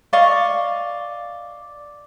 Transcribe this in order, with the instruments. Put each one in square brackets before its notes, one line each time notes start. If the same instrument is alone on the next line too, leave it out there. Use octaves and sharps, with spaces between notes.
[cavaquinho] D5 D#5 F5 C#6